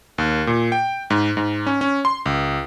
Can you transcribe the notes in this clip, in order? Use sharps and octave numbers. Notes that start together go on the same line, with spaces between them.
D#2
A#2
G5
G#2
G#2
C#4
C#4
C6
C#2